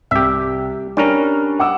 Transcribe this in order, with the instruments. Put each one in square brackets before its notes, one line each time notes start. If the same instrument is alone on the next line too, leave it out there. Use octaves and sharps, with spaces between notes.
[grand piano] C2 [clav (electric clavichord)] G4 E5
[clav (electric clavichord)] G3 C#4 A#4 [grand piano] D4
[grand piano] F#5 D6 E6